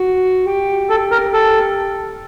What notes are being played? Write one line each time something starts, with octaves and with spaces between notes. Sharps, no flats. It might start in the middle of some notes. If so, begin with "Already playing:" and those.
Already playing: F#4
G4
A4
A#4
A4